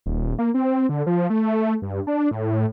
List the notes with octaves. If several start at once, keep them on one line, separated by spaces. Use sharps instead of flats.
D#1
A#3
C4
D3
F3
A3
G2
D4
A2